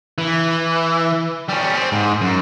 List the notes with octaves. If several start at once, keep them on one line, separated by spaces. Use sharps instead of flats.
E3
G3 C#4
C4
G#2
F#2